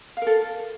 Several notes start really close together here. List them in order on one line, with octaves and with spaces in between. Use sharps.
F5 A#4 A4